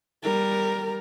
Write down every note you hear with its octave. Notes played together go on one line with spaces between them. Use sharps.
G3 A#4